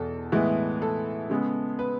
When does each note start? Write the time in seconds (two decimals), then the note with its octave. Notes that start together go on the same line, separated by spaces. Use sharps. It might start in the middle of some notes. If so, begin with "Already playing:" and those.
Already playing: E2 B2 A4
0.32 A2 E3 G#3 B3
0.82 A4
1.30 C#3 G#3 B3
1.79 B4